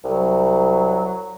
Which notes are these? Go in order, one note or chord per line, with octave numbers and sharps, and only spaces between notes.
C2 F#3